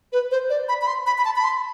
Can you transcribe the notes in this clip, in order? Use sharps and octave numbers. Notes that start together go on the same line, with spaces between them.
B4
C5
D5
B5
B5
C6
B5
B5
A5
B5
C6